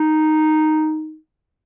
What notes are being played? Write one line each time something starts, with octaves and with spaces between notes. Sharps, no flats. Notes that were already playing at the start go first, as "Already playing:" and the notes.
Already playing: D#4